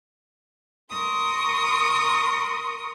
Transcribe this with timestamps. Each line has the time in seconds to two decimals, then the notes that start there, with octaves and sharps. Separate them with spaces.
0.92 A#4 C6 C#6 D#6